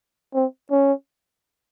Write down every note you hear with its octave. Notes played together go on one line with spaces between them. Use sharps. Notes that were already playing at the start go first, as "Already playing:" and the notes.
C4
C#4